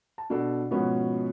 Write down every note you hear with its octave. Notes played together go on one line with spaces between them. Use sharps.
A5
B2 D4 A4
G#2 B2 F3 B3 C#4